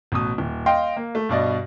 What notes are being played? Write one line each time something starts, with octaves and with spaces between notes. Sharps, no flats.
A1 B2 D#6
D#1
D#5 F5 G5 C6
A#3
A3
G2 B2 D5 D#5